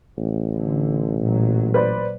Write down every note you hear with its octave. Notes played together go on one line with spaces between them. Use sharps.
A1
D3
A#2 F#3
B4 C5 D5